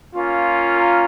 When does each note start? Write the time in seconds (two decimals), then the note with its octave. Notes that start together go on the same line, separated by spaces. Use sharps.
0.16 A#3 C#4 F4
0.75 A#4